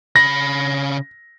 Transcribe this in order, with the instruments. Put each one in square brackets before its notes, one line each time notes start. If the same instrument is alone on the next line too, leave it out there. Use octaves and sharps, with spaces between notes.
[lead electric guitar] C#3 B5 [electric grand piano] A#6